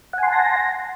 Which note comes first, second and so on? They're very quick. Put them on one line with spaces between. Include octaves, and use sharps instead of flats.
F#5 G#5 C6 A5 A#6